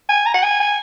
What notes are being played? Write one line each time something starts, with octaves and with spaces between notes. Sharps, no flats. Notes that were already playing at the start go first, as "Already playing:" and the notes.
G#5
A#5
F#5
G#5
G#5